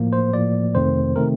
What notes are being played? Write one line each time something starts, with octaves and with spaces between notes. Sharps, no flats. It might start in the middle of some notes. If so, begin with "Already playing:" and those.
Already playing: A2 F3 A#3
C5
A2 F3 A#3 D5
F2 C3 D#3 A3 C4 C5
C3 D#3 A3 C4 A#4